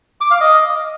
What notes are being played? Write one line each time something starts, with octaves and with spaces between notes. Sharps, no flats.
D6
F5
D#5